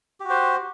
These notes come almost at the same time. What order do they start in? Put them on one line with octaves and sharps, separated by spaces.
G4 F#4 C5